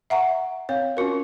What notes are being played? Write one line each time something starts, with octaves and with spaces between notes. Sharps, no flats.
E5 F#5 A#5 C#6
C4 C#5 F5
C#4 F4 F#4 A#4